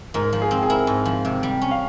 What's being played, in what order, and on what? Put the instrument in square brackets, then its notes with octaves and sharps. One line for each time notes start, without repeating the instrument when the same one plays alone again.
[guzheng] G#2 [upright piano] A#4
[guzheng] F3
[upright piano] G#4
[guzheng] C4
[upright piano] G#4
[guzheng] E4 [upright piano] A#4
[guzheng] G#2
F3
C3
G3
C#4
[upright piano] F5